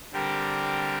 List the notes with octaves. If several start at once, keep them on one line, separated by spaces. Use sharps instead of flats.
D3 G3 C4 G4 A#4